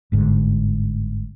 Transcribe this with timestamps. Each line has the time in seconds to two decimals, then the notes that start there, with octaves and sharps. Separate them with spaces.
0.12 G1 G#2 D3